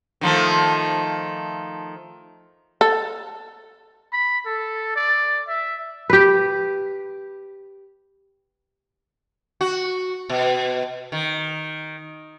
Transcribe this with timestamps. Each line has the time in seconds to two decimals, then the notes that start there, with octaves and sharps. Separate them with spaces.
0.21 D#3 F3 A3
2.81 A4
4.13 B5
4.46 A4
4.96 D5
5.48 E5
6.10 G4 B4
9.61 F#4
10.30 B2
11.12 D#3